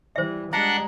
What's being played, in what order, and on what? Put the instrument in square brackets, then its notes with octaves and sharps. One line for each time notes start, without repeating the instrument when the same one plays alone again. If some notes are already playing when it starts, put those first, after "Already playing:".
[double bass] E3 G3 [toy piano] C5 E5
[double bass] G3 G#3 [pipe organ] D4 F#5 [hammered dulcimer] A#5